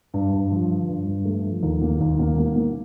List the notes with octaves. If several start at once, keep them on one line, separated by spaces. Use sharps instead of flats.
G2
G2
F3
D3
G2
G2
A3
F3
D#2
A#3
D#2
A#3
A#3
A#3